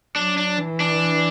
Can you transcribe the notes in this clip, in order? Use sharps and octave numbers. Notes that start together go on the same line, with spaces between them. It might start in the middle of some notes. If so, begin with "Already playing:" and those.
F#3 D4
D4
E3
D4